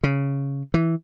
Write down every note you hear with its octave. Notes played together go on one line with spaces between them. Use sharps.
C#3
E3